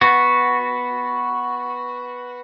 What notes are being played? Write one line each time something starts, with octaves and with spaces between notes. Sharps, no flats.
B3 F#4